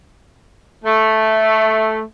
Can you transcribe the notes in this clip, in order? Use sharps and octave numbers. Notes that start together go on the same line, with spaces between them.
A3